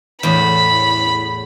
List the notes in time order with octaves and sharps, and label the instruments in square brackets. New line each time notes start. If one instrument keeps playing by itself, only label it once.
[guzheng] E2 A2 [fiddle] B5